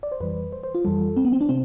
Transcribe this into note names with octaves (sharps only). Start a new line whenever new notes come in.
D5
C5
F2 E3 G3 B4
C5
C5
F4
F2 E3 G3 A4
C4
B3
C4
D4
C3 C4